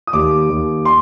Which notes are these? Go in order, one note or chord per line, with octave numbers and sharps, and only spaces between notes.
D#6
D#2 D6
D#2
C6